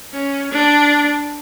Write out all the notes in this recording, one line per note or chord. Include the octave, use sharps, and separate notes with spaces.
C#4
D4